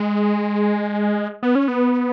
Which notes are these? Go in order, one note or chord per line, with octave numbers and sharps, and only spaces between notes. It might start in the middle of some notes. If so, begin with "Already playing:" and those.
Already playing: G#3
B3
C#4
B3